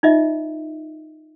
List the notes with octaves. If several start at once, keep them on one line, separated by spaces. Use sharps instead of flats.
D#4 F4 D#5 E5